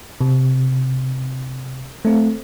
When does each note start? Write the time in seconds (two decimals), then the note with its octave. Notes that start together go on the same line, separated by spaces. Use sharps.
0.21 C3
2.05 A3 C4